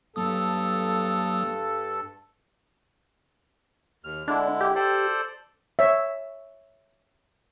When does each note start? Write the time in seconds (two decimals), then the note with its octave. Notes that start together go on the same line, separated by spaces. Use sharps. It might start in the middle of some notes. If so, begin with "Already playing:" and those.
0.16 G2 F#3 A#3 A4 D#6
4.04 D#2 F6
4.28 D3 G#3 D4 E4
4.61 G4
4.75 A4 C5 D5
5.79 C#5 E5